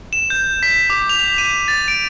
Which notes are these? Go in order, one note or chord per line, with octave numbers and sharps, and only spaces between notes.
E7
G6
B6
D6
F7
D#7
A6
D7